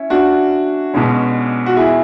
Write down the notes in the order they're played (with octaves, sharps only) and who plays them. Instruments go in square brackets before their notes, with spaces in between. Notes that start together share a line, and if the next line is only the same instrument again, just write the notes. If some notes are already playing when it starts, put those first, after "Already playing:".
Already playing: [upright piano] C#4 E4
[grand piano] D4 F#4
[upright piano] B1 B2 G#3 C#4
[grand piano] F#4
E4 G#4